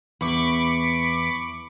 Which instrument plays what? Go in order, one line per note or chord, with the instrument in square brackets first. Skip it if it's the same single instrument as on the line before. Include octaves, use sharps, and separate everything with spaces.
[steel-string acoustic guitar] E2 [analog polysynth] B5 C#6 D6